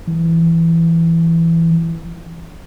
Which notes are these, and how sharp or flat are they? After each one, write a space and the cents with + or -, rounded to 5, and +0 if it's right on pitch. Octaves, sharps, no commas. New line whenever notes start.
E3 +10